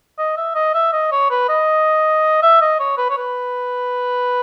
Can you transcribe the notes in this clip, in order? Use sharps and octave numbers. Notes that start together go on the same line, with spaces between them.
D#5
E5
D#5
E5
D#5
C#5
B4
D#5
E5
D#5
C#5
B4
C#5
B4